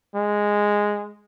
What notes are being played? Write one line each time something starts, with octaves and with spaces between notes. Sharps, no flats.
G#3